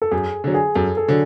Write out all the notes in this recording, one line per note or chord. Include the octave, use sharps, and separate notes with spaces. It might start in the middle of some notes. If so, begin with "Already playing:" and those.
A4
F#2 G#4
D3 F#3
G#4
F#2 A4
A4
D3 F#3